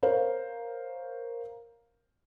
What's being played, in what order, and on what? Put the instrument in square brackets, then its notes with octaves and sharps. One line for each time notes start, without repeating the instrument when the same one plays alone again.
[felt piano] A#4 C5 C#5 F5